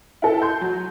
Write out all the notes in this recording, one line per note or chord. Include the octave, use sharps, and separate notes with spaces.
E4 A4
C6 G6
F#3